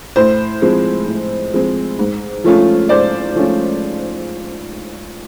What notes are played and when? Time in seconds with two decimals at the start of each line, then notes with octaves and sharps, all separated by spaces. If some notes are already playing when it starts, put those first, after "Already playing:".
0.16 A2 C5
0.62 F3 G#3 C4
1.07 A2
1.53 F3 G#3 C4
1.99 G#2
2.44 F3 A3 C#4 F4
2.89 G#2 C5 D5
3.36 F3 A3 C#4 F4